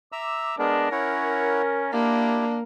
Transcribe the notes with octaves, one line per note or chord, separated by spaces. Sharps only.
E5 A#5 D6 E6
G#3 B3 D4 G#4 A#4
C#4 E4 C#5 F#5
A#3 D4 E4 G4